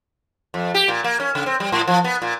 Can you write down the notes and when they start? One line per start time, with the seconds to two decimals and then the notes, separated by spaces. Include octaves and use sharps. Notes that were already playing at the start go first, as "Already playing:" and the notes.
0.54 F2
0.74 G4
0.88 A#2
1.04 A#3
1.20 C#4
1.35 C#3
1.46 C4
1.60 G3
1.72 A2
1.88 F3
2.04 B3
2.22 A#2